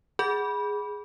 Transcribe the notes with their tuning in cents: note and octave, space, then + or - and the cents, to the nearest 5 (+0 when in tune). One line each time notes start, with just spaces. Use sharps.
G#4 +0 B5 -15